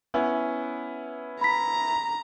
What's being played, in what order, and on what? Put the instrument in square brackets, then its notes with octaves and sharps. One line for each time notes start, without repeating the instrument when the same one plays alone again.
[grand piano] B3 C#4 E4
[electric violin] A#5 [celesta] B5 B6